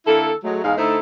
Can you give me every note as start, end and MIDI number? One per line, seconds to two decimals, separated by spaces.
0.07 0.32 50
0.07 0.32 58
0.07 0.32 64
0.07 0.32 69
0.44 0.64 54
0.44 0.64 56
0.44 0.64 57
0.64 0.73 40
0.64 0.73 44
0.64 0.73 56
0.64 0.73 68
0.64 0.73 77
0.78 0.99 50
0.78 0.99 57
0.78 0.99 63
0.78 0.99 64
0.78 0.99 69
0.78 0.99 72